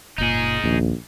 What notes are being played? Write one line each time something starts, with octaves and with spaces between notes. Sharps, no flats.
F#1 A#2 D#4 G#4
A#1 D#2